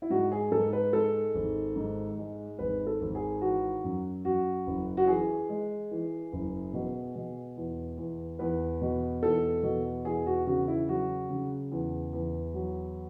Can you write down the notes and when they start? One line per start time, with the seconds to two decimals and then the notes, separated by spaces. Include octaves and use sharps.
0.02 E4
0.10 G#2 F#4
0.32 G#4
0.51 G#2 A4
0.73 B4
0.93 G#3 A4
1.35 G#1
1.76 G#2
2.18 G#3
2.59 G#1 B4
2.87 A4
3.01 G#1
3.15 G#4
3.41 E3 F#4
3.84 F#2
4.25 F#2 F#4
4.67 F#1
4.97 F#4
5.07 E3 G#4
5.49 G#3
5.91 E3
6.32 F#1
6.73 B2
7.16 B2
7.57 E2
7.98 E2
8.39 E2 B4
8.81 B2
9.23 E2 A4
9.63 B2
10.05 E2 G#4
10.26 F#4
10.46 C#3 F#4
10.68 E4
10.88 F#3 F#4
11.30 C#3
11.72 E2
12.13 E2
12.54 F#3